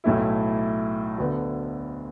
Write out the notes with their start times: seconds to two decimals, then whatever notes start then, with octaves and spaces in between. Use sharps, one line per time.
0.04 B1 A2 A3 E4
1.18 D2 D3 B3